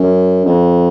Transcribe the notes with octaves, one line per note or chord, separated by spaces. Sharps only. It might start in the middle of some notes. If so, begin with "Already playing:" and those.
Already playing: F#2
F2